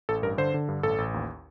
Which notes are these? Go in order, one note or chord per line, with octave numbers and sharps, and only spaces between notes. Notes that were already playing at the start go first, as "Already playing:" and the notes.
A1 A4
G2 A#4
D3 C5
D3
G2
A1 A4
A1
D#2